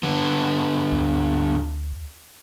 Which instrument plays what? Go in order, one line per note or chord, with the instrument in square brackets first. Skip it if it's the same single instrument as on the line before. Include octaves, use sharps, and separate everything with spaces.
[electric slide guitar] D3 B3
[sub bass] D2